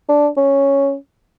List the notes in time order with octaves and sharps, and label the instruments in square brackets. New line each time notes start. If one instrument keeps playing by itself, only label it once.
[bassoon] D4
C#4